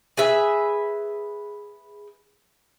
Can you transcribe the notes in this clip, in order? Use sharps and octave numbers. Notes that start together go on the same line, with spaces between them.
G#4 B4 E5